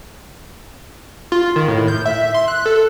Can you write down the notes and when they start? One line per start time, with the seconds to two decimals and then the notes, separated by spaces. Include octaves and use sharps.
1.32 F4
1.56 D#3
1.68 A2
1.88 G6
2.06 E5
2.34 C6
2.48 F#6
2.66 A4